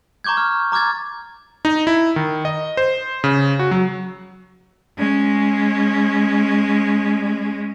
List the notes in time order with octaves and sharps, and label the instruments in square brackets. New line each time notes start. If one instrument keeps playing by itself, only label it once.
[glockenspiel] A#5 C#6 D6 G6 G#6
F6
A#5 D6 F6 G#6 A6
[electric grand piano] D#4
E4
D#3
D#5
C5
C#3
F#4
F#3
[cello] G#3 C#4